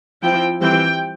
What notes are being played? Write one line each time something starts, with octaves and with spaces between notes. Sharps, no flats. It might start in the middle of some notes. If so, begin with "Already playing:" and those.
F3 C4 E4 G5
E3 G3 C4 G5